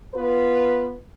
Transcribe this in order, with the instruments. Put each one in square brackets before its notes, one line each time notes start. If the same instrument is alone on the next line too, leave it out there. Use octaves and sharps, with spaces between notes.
[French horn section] B3 F4 B4